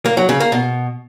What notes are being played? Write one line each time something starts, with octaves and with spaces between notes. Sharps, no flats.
A#3
F#3
C#3
A#3
B2